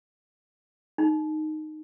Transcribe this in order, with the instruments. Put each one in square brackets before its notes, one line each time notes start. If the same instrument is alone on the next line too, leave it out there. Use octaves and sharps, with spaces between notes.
[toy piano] D#4